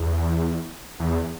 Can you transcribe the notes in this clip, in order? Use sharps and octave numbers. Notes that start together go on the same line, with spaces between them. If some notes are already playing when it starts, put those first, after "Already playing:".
Already playing: E2
E2